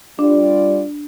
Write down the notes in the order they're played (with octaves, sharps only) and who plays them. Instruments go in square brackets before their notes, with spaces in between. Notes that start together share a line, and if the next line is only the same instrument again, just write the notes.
[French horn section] G3 F4 D5 [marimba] D4